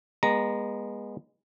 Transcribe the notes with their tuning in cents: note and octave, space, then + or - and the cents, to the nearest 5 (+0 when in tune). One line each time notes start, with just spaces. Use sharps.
G#3 -20 B3 -30 A#5 +0